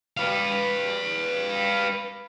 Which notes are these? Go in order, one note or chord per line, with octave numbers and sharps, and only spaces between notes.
B4 F5